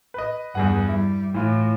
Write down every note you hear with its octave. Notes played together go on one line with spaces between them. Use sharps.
B4 D#5
E2 G2 G#4 F#5
G3 E4
A2 E3 F4